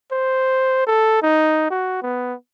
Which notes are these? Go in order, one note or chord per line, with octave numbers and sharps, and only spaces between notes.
C5
A4
D#4
F#4
B3